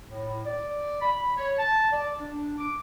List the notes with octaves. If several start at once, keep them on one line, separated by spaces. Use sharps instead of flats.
A2
D5
B5
C#5
A5
D5
D4
D6